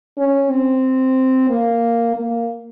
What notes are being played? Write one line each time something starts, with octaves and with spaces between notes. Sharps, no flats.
C#4
C4
A#3
A#3